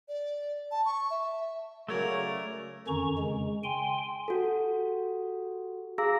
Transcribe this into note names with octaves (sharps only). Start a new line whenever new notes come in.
D5
A5
C#6
E5
C#3 F#3 A3 A#4 C#5 D5
F2 D3 D#3 C#4 A#5 C#6
C#3 G#3
G5 G#5 C6
F#4 G4 A4
G#4 F5 A#5 D6 E6 A#6